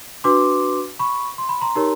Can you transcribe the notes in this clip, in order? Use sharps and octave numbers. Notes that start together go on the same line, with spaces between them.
D4 F#4 B4 C6 D6
B5 C#6
C6
B5
A#5 C6
D#4 G4 A#4 C#5